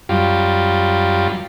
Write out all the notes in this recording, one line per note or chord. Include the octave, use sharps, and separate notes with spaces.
F#2 G3 F4